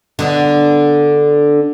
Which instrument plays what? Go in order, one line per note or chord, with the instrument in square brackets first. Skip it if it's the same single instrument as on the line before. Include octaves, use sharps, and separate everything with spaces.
[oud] D3 B3 D4